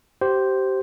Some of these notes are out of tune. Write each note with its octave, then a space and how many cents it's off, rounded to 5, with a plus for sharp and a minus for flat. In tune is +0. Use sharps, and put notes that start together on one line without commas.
G4 -25 C5 +0